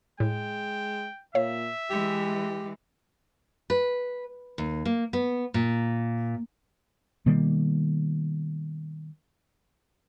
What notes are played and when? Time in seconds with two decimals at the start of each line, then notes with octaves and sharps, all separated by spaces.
0.20 A2 G#3 G5
1.35 A#2 C#5 E5 F5
1.90 E3 G#3 G4
3.70 B4
4.58 D#2
4.85 A#3
5.13 B3
5.54 A#2
7.26 B2 D#3 G3 A#3